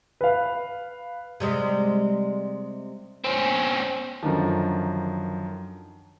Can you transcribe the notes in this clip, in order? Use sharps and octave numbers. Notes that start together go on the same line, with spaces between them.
B4 F5
C3 G3 G#3
C4 C#4
F#2 D3 D#3 F3